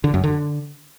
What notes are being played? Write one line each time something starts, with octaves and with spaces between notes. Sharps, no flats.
D3
F#2
D3